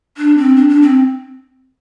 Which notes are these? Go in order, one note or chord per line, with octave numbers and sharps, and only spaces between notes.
D4
C4
D4
D4
C4